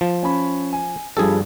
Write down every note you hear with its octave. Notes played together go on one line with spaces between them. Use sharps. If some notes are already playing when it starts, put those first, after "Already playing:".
F3 E7
C#4 B5
G#5
G2 F3 G3 G#4 A4